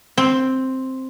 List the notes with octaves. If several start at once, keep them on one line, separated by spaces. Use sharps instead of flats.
C4